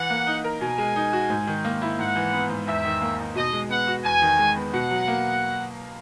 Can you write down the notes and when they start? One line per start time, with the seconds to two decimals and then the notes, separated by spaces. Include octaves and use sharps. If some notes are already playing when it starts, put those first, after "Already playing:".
Already playing: E3 F#5
0.10 A#3
0.27 D#4
0.44 A#4
0.61 B2 G#5
0.78 G#3
0.96 D#4
1.13 F#4
1.30 G#2
1.47 D#3
1.65 A#3
1.82 E4
1.99 G#2 F#5
2.16 E3
2.33 B3
2.50 G#2
2.67 E2 E5
2.84 D#3
3.01 A#3
3.19 D#4
3.35 B2 D#5
3.53 G#3
3.70 B3 F#5
3.87 F#4
4.04 E2 G#5
4.22 D#3
4.39 G#3
4.56 B3
4.73 B2 F#5
4.91 F#3
5.08 A#3